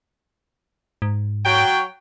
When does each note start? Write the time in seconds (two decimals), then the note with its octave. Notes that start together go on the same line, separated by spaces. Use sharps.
1.02 G#2
1.46 F#3 C#5 G5